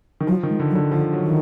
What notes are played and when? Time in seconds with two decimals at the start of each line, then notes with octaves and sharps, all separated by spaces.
0.21 D#3
0.27 F3 F#3
0.43 D#3
0.49 G#3
0.60 D3
0.70 F#3
0.75 D3
0.91 D3 F3
1.13 F#3
1.24 D#3